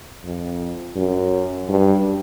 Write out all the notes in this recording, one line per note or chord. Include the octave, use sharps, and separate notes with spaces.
F2
F#2
G2